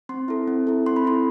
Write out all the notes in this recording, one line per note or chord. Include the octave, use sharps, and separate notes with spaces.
C4 C6
E4 A4
C4
E4 A4
C4 C6
B5
E4 A4 C6